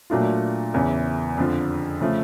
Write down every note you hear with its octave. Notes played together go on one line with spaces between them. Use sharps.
A#2 F#3 A3 D4 F4
E2 C#3 E3
F2 D3 F3
C#3 F3 A3